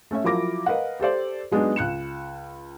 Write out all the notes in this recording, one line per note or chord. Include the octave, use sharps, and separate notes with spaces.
A3 C#4 C#5 E5
F3 F#3 E4 A#4 D6 A#6
A#4 B4 D#5 F5 F#5
G4 A4 C5 D5
F#3 G#3 B3 D4 D#4
C#2 F#6 C#7 E7